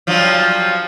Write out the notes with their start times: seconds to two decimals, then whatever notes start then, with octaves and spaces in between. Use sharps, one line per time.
0.07 G2 F3 F#3